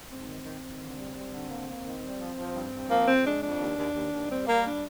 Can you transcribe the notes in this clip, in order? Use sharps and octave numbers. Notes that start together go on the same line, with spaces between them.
G#2 C4
D#3
D#3
D#3
D3
G3
G3
D3
A#3
A#3
D#3
G3
F3
F3
G2
G2
F3 A#3
F2 C4
G#3 D4
F2 D4
D#2
D#2
D#2
D#2
G3 C4
G3 A#3
D4